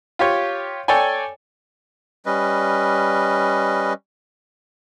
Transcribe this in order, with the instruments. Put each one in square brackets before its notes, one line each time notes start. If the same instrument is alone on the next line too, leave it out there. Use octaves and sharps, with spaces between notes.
[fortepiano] F4 G4 C#5
A4 C#5 D5 G5 G#5
[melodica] G3 C#4 B4 D#5